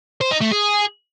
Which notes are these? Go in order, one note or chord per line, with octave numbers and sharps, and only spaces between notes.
C5
D#4
A3
G#4